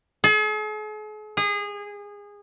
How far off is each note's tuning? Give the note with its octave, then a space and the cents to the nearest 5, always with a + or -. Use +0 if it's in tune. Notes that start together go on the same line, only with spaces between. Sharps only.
G#4 +45
G#4 -25